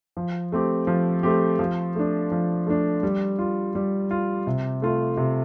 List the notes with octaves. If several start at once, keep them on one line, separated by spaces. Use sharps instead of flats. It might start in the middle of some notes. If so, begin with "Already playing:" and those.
F3
A3 C4 G4
F3
A3 C4 G4
F3
A3 D4
F3
A3 D4
G3
F4
G3
F4
C3
A3 F4
C3